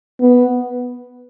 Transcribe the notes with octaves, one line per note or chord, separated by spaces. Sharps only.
B3